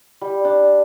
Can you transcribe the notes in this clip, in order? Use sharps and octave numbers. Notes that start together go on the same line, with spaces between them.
G3
D4